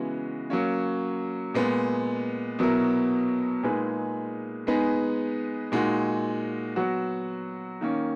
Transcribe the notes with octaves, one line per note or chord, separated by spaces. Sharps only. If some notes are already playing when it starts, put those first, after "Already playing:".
Already playing: C#3 E3 G#3 B3 F#4
F#3 A#3 C#4
A#2 G#3 B3
B2 F#3 B3 E4 A#4
A#2 G#3 D#4 G#4 B4
G#3 B3 D#4 G#4 B4
A#2 G#3 D#4 F#4
F#3 B3 F#4
D#3 A#3 C#4